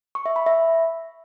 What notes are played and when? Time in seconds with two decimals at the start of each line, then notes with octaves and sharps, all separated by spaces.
0.15 C#6
0.26 E5
0.36 B5
0.46 E5